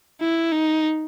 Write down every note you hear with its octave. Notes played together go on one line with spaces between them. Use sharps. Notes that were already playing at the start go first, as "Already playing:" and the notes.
E4
D#4